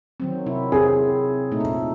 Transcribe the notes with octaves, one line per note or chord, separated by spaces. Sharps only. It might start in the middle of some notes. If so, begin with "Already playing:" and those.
D#3 F#3 C4
C3 E4
C4 G#4
A#2 A3 D#4